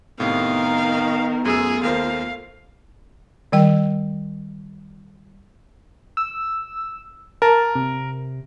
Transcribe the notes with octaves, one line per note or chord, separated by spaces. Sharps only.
A2 C3 D#3 B3 A#4 F5
F#2 A3 F4 G#4 E6
D#2 A#4 C5 F5
D#3 G3 G5
E6
A#4 A5
C3